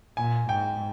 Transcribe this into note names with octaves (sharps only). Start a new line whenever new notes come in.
A#2 G#5
G#2 G5